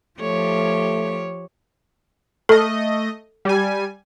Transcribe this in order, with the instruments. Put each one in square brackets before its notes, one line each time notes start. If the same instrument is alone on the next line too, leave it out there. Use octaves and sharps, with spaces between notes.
[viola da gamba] F3 G4 C#5 [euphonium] A3
[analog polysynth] A3 D#5 [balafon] A4
[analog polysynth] G3 G#5